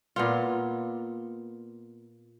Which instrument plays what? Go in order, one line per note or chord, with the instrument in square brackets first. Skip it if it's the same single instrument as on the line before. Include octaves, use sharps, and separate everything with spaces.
[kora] A#2 B3 F4